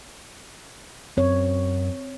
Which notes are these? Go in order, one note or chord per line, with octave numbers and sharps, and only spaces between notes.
F#2 C4 C#5